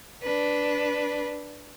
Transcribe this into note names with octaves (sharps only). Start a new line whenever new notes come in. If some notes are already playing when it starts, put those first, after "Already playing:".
D4 B4